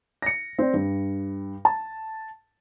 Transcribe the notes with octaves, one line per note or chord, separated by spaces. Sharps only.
A#6 C#7
C4 D5
G2
A5